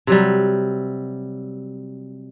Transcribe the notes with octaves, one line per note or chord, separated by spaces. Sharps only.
C3 F#3 G3